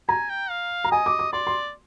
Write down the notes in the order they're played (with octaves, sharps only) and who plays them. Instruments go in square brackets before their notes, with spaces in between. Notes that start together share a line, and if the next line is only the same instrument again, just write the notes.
[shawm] G#5 [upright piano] A#5
[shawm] G5
F5
[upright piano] A#5
[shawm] D#5 [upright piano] G#5
[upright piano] D6
D6
[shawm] D5 [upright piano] C6
[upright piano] C6